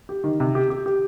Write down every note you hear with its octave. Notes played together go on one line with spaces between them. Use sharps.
G4
D#3
C3
G4
G4
G4